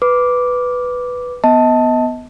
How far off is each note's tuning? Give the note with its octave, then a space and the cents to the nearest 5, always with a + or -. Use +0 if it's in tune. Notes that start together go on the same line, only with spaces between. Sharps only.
B4 +0 D6 -5
B3 +0 D#5 +35 A5 +0